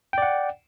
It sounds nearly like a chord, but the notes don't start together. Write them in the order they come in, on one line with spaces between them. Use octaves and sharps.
G5 D5 F#5